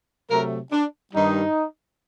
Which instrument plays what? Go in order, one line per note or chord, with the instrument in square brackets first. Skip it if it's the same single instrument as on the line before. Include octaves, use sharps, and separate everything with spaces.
[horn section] C3 F#3 A3 A#4
D4
G2 D#3 G3 D#4